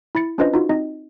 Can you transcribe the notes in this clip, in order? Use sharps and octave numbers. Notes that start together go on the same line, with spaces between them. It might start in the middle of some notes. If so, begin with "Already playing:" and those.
E4 B5 A6 C#7
C#4 D4 F4 B4 C5 D#5
D#4 F4 F#4
C4 D#4 D#5